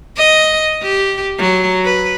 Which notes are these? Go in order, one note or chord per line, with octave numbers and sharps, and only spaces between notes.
D#5
G4
F#3
B4